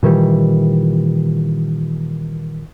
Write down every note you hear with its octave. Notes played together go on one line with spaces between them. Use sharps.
A#2 D#3 E3 G3